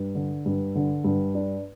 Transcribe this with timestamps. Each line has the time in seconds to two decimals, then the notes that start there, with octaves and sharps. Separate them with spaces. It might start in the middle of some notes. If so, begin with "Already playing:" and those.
Already playing: G2
0.15 D3
0.46 G2
0.75 D3
1.04 G2
1.35 D4